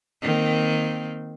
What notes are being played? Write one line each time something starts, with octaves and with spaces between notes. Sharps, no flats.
D#3 A#3 C4